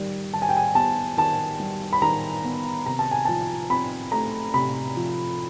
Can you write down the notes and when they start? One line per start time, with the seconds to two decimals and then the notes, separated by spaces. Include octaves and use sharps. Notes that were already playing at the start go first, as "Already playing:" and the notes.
Already playing: D#3 G3
0.34 D#3 A5
0.42 G#5
0.49 G5
0.57 G#5
0.75 B3 A5
1.17 D#3 A5
1.60 G3
1.93 B5
2.02 D#3 A#5
2.44 B3
2.86 C3 A#5
2.99 A5
3.11 G#5
3.25 F3 A5
3.70 C4 B5
4.12 A3 A#5
4.54 C3 B5
4.96 F3